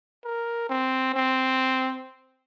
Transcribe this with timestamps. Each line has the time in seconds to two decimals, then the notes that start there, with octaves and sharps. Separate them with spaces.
0.25 A#4
0.69 C4
1.15 C4